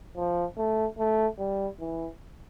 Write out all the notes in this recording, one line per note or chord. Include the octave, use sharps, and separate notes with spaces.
F3
A3
A3
G3
E3